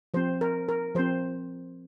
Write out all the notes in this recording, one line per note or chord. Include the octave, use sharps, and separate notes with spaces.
F3 C4 C5
A#4
A#4
F3 C4 C5